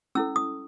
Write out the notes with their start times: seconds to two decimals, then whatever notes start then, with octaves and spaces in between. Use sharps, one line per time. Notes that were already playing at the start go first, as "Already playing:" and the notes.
0.15 C#4 E4 A4 E6
0.36 D#6